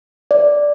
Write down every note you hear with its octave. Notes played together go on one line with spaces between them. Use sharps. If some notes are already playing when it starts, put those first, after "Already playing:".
D5